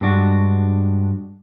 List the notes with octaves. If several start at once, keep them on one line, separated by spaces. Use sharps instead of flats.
G2 G#3 D4 F#4